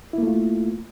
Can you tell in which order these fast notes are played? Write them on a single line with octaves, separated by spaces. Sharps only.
E4 A#3 A3 F4